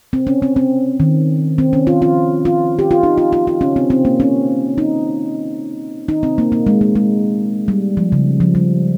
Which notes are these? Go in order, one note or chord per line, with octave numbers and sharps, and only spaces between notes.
C4
C#4
C4
C4
D#3
C4
C#4
F4
F4
F4
G4
F4
D#4
F4
F4
F4
C#4
C4
C4
A#3
C#4
D#4
D#4
C4
A#3
A#3
G#3
A#3
G#3
G3
F3
C#3
F3
G3